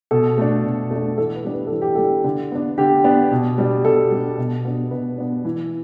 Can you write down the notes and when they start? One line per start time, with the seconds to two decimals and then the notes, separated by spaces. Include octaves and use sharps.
0.11 B2 A4
0.38 A3 D4
0.64 B2
0.91 A3 D4
1.18 E3 A4
1.36 B4
1.45 G3 D4
1.54 B4
1.67 E3 A4
1.82 G4
1.95 G3 D4 A4
2.24 D3
2.51 B3 D4
2.78 D3 G4
3.04 B3 D4
3.31 B2
3.58 G3 D4
3.85 B2 A4
4.11 G3 D4
4.38 B2
4.64 B3 D4
4.91 B2 B4
5.18 B3 D4
5.45 E3